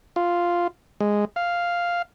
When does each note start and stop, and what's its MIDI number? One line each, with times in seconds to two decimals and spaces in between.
0.16 0.67 65
1.01 1.25 56
1.36 2.02 77